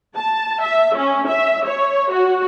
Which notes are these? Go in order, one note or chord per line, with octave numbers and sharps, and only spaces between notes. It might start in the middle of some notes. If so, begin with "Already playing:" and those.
A5
E5
C#4
E5
C#5
F#4